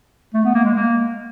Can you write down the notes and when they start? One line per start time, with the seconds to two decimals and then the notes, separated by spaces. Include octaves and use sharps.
0.34 A3
0.44 B3
0.54 A#3
0.64 G#3
0.75 A#3